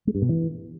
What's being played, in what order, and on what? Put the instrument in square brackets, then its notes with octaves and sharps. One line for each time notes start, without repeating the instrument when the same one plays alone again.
[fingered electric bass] G#3
G2
B2
E3